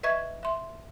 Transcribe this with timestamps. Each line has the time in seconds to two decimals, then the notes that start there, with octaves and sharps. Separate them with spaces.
0.03 B4 D#5 E5 C#6 G#6
0.43 E5 C6